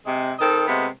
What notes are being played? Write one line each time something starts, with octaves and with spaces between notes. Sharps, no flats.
C3 G#3
D#3 C4 A4 D#5
C3 G#3 A3 B3